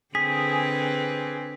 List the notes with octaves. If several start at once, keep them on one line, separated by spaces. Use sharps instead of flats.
D3 C4 G#4 B4 B6